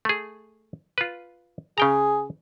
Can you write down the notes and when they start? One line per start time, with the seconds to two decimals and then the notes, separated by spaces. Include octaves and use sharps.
0.05 A3 G#4
0.98 F4 B4
1.78 C#3 G#4 G5 A#5